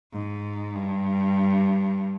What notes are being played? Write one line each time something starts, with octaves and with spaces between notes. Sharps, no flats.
G#2
G2